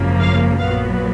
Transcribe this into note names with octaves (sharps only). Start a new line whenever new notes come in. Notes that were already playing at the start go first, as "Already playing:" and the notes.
Already playing: G#1 F#2 C#3 F3 A#3
F5
A#1 A#2 F#3 B3 F5